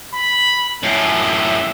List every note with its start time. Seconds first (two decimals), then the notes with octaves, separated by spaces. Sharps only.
0.14 B5
0.83 F#2 A2 E5